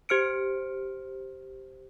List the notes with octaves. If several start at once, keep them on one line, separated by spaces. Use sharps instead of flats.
G4 C5 F6 C#7 D7